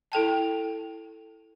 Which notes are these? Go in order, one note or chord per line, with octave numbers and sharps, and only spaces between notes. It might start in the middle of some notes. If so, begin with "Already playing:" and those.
E4 A4 G5 A5